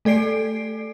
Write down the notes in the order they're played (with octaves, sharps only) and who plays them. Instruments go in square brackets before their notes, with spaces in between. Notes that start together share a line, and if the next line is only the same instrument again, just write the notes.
[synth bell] A3 A4 D5 C7 D7